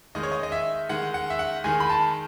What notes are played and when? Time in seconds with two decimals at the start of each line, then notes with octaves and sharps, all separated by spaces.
0.15 D#3 G#3 D#5
0.23 C#5
0.31 D#5
0.43 D#5
0.52 E5
0.89 D#3 G#3 F#5
1.14 F#5
1.30 E5
1.39 F#5
1.64 D#3 G#3 G#5
1.80 B5
1.89 A5